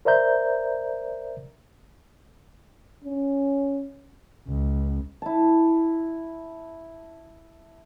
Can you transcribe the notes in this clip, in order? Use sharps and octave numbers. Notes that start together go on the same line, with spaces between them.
A#4 C5 D5 E5 A#5 G6
C#4
C#2
E4 A5